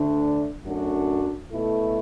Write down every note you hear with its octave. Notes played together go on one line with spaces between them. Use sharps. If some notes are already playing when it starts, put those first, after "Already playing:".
Already playing: D2 D3 A3 D4
F#2 F#3 A3 D4 F#4
B2 A3 E4 A4